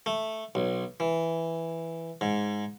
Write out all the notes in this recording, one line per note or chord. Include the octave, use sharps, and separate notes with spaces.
A3
B1
E3
G#2